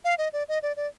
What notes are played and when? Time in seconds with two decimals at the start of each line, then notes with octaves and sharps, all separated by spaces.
0.05 F5
0.18 D#5
0.33 D5
0.49 D#5
0.63 D5
0.77 D5